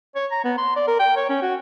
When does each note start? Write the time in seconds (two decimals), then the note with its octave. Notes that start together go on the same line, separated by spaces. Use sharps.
0.15 C#5
0.31 A#5
0.44 B3
0.58 C6
0.76 D5
0.88 A#4
0.99 G5
1.16 C#5
1.29 C#4
1.42 F#4